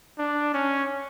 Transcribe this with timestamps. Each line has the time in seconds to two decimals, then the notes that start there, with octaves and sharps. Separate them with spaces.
0.18 D4
0.54 C#4